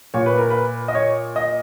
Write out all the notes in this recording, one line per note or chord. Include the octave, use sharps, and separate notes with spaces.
A#2 C#5
B4
A#4
B4
D#5
C#5
D#5